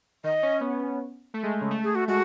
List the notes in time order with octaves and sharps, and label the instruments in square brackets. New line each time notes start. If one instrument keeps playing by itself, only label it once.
[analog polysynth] D#3 [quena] D#5
[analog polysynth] C#4
B3
A3
G#3
C#3
A3
[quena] G#4
F#4
[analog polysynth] G#3 [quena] F#4